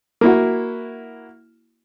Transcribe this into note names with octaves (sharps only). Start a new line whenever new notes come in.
A#3 E4 F#4